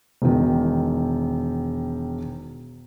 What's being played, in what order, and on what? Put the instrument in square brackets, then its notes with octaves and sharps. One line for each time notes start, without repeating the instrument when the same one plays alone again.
[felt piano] E1 D#3